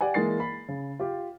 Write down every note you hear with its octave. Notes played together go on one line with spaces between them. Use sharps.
G4 D5 F#5 G#5
E3 G#3 A#3 A6 C7
B5
C#3
F4 G4